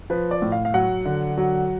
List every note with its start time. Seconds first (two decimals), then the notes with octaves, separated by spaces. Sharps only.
0.10 F3 B4
0.31 D5
0.42 A2
0.52 F5
0.65 F5
0.74 F#3 F#5
1.06 D3
1.38 F#3